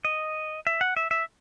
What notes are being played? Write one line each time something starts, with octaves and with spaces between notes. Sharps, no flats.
D#5
E5
F#5
E5
E5